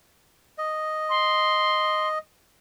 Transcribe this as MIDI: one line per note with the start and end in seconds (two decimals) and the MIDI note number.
0.58 2.18 75
1.09 2.08 84